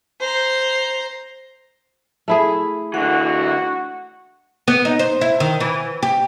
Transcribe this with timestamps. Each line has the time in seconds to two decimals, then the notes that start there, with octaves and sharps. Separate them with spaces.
0.20 C5 A#5
2.28 A3 E4 G#4
2.94 D3 E3 F#4 F#5
4.68 B3
4.85 D#4
4.99 C5
5.21 E4
5.40 D#3
5.60 E3
6.03 G4